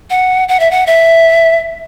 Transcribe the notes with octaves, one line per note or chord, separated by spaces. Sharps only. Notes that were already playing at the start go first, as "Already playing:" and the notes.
F#5
F#5
E5
F#5
E5